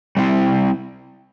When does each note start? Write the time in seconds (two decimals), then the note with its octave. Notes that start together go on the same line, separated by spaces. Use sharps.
0.17 G3 C4 E4